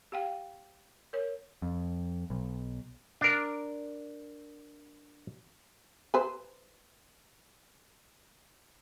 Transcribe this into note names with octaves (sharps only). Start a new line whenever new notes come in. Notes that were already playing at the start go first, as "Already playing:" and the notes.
G4 F5 G5
A#4 C#5
F2
B1
D4 A#4
B4 C5